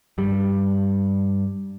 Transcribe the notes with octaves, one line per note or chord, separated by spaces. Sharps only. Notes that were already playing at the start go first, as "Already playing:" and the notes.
G2 G3